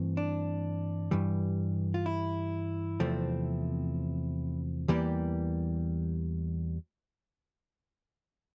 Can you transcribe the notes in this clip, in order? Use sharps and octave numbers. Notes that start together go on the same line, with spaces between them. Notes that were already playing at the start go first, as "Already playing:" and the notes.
Already playing: G2 E3 A3 C4
D4
G2 E3 G3
F4
E4
E2 C3 F3 A3 C4
E2 E3 G3 A#3 G4